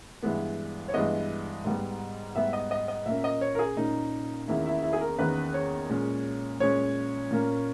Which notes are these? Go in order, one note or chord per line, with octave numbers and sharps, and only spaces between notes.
G2 E3 G#3 B3
C#5
G2 E3 G#3 B3 D#5
G#2 G3 B3
G#2 G3 B3 E5
D#5
D#5
D#5
A#2 A#3 C#4 E5
D#5
C#5
A#4
G#4
A#2 A#3 C#4 D#4
E2 D#3 A#3 C#4 E4
E4
E4
G#4
A#4
E2 D#3 A#3 C#4 B4
C#5
A#2 G#3 C#4
A#2 G#3 C#4 C#5
A#2 A#3 C#4